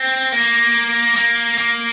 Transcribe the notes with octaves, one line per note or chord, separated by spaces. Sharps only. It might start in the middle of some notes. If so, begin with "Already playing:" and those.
Already playing: C4
A#3
A#3
A#3